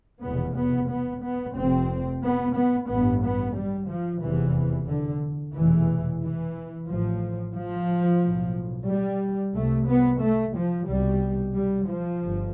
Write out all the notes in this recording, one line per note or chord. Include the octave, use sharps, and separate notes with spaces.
F1 E2 B2 B3
B3
B3
B3
F1 F2 C3 C4
B3
B3
A1 G2 B3
B3
G3
F3
F1 E2 C3 E3
D3
F1 E2 B2 E3
E3
A1 A2 F3
F3
B1 A2
G3
C2 C3 A3
B3
A3
F3
C2 B2 G3
G3
F3
G1